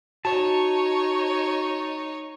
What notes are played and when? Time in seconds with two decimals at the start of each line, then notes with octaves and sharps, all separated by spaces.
0.25 D#4 F#4 C#5 A5